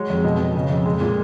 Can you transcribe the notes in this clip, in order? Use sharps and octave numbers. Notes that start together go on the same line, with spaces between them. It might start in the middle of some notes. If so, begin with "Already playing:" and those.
Already playing: F#3 G#3 C#5
F2
B2 D#5
B2
C#3
F2
G#3
A#2